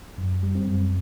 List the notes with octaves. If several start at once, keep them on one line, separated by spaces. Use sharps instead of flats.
F#2
G3
C4
F#2